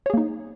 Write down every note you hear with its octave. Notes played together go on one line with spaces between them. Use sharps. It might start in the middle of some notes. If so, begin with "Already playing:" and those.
A#3 D#4 G#4 C#5